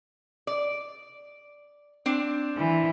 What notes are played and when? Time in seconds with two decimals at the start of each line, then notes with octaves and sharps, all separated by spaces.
0.47 D5
2.06 C4 D4
2.58 E3